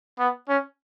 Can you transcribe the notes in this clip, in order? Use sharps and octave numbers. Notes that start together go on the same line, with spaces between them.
B3
C#4